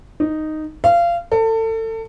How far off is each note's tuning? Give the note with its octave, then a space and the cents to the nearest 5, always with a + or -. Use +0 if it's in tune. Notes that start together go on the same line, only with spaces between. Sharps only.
D#4 -5
F5 -25
A4 +30